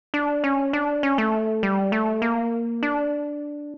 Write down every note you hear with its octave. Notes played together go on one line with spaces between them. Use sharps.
D4
C#4
D4
C#4
A3
G3
A3
A#3
D4